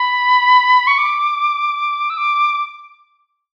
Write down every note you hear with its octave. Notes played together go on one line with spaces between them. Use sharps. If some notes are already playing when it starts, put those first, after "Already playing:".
Already playing: B5
C#6
D6
E6
D6